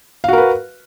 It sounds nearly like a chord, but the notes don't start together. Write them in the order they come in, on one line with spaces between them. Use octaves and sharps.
F5 F#4 A#4 B4